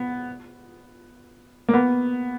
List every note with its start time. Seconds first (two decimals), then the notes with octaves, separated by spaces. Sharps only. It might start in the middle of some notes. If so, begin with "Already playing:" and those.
Already playing: B3
1.69 A#3
1.74 B3